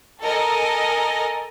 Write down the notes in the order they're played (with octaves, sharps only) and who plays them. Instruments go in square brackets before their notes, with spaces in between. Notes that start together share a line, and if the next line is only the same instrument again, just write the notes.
[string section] A4 A#4 D#5 G#5